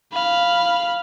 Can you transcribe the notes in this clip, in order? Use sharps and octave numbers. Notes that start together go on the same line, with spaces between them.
F5 B5